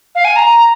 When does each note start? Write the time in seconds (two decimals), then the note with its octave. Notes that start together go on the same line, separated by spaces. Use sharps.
0.15 F5
0.25 G#5
0.36 A#5